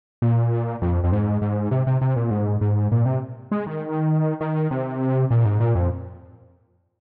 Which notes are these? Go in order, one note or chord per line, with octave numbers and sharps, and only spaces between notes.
A#2
F2
F2
G#2
G#2
C3
C3
C3
A#2
G#2
G#2
A#2
C3
G#3
D#3
D#3
C3
A#2
G#2
A#2
F2